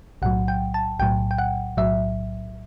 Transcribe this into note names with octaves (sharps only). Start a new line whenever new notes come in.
B1 A2 F#3 F#5
G5
A5
B1 A2 F#3 G5
G5
F#5
B1 A2 F#3 E5